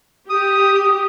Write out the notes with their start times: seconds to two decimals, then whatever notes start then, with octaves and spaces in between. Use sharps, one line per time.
0.30 G4 D#6